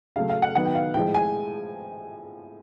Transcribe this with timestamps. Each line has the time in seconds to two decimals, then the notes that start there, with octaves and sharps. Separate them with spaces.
0.16 C#3 F#3 A3 F5
0.29 F5
0.42 F#5
0.55 D#3 F#3 B3 F#5
0.65 G5
0.75 F5
0.94 A2 F3 G#3 G5
1.14 G#5